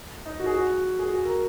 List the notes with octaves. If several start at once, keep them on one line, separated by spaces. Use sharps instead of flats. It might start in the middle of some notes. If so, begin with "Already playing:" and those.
D#4
F#4
G#4
F#4
G#4
F#4
A#4